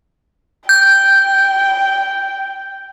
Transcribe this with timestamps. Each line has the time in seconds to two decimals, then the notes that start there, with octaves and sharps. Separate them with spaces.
0.69 G5 G6